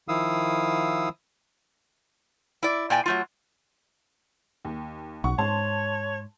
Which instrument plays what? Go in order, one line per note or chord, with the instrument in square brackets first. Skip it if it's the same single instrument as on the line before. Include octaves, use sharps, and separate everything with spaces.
[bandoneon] D#3 F3 E4 F5 D#6 E6
[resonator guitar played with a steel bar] E4 D5
A#2 D5 G5 G#5
F#3 A3 F4
[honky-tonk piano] D#2
[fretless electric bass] B1 [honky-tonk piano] F#5 C#6
[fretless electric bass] G#2 [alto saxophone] C#5 [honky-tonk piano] A5 C6